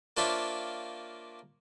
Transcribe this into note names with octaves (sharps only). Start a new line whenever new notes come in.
A#3 D4 F4 C5 C#5 E5